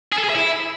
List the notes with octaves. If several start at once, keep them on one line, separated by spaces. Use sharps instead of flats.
G#4
A4
G#4
E5
E4